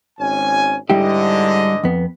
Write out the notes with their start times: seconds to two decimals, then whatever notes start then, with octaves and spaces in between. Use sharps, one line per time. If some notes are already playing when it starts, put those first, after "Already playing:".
0.20 G#1 C#4 G#5
0.90 G#2 D3 G3 E4 G4 D#5
1.84 F2 B3